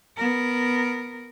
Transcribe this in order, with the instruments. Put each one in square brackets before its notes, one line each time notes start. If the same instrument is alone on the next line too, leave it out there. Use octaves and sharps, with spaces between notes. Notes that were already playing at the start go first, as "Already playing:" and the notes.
[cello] B3 A#4